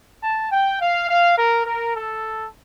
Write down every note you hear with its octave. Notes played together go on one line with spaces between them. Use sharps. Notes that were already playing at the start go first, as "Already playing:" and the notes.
A5
G5
F5
F5
A#4
A#4
A4